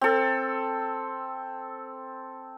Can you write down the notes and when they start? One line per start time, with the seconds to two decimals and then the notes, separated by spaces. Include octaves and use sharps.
0.01 C4 A4